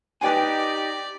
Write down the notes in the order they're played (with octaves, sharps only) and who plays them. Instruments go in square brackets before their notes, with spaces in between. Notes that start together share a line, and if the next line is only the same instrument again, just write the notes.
[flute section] D#4 G4 [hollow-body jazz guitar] B4 G5 G#5 [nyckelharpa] D5